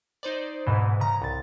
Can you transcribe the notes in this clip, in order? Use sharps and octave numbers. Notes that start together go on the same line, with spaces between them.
D#4 C5 D5
D2 G#2 B2 E3
C#3 A#5
C2 A6